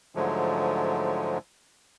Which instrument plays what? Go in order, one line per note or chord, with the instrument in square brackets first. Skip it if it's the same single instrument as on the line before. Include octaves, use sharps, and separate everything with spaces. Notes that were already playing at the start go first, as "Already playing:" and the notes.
[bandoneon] G#2 D3 F3 F#3 G#3 A3